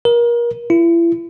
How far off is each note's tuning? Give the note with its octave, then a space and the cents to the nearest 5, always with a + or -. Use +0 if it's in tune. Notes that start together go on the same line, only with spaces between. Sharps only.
A#4 +30
E4 +35